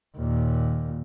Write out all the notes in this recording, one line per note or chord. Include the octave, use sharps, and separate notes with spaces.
D#2 A#2